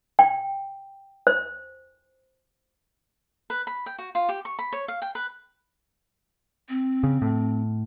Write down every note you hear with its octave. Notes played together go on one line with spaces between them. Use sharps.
G5
C5
B4
B5
G5
F#4
F4
G4
C#6
B5
C#5
F5
G5
B4
C4
C#3
A2